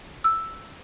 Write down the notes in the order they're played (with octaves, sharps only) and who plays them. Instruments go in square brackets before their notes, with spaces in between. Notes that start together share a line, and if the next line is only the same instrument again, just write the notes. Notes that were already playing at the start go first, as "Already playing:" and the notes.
[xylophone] E6